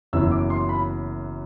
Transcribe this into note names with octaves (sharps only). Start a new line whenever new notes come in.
F#1 F#2 E3 B3 E6
D6
C6
B5